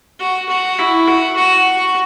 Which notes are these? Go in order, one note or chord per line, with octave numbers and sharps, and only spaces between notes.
F#4
F#4
E4
F#4
F#4